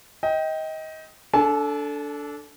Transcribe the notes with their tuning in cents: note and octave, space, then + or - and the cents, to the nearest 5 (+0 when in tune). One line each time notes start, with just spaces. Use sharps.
D#5 +25 G5 -5
D4 -15 A4 +0 G#5 +45